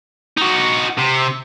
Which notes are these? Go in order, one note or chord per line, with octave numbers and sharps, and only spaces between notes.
D#4 F#4
C3